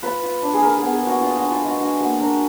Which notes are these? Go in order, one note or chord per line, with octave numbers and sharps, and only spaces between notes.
F4 B4
F4
D4
G#4
F4 A#4
B3 G#4
G#4
D4 F#4
D4 F4
F#4
D4
F4
G#3
F#4
D4 F#4
A#3 F#4
D4 A#4